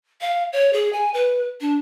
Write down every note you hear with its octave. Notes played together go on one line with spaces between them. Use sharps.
F5
C#5
G#4
G#5
B4
D4